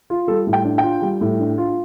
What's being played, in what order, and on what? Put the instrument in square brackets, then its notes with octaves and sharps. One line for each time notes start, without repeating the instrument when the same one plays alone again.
[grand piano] F4
G3 A4
A2
G5
D4
F4 G5
G3
A2
D4
F4